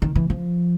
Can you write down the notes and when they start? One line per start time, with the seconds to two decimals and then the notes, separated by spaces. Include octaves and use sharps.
0.02 D#3
0.15 E3
0.30 F3